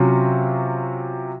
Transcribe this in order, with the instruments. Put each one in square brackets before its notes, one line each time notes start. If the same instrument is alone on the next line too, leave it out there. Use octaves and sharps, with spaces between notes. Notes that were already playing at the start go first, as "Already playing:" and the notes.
Already playing: [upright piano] C3 F#3 C#4 F4